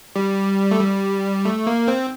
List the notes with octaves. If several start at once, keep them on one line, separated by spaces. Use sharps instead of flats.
G3
A3
G3
A3
A#3
C4